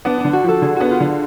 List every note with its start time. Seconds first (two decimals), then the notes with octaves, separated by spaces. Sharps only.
0.05 B3 D4
0.20 D3 D4
0.33 F#4
0.43 F3
0.49 A4
0.62 D3 G#4
0.76 B3 F#4
0.91 F4
1.00 D3